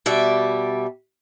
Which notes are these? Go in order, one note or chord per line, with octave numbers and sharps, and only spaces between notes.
B2 G3 D5 E5